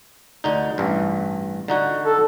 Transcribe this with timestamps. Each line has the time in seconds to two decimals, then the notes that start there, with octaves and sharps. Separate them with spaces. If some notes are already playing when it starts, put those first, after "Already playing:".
0.44 D2 D3 D#4
0.78 A1 G2
1.68 D3 D#4 F#4
2.05 A4